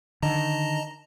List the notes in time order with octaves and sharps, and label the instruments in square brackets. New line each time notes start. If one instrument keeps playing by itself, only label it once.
[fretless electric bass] D3 D#3 [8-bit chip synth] D#5 A5 A#5